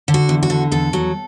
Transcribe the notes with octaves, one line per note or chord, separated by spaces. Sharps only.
D3
F#4
E2
F#4
D3
E2 A4
F#3